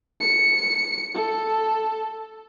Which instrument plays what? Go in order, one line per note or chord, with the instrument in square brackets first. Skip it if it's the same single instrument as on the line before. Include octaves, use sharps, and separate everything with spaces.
[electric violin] C#7
A4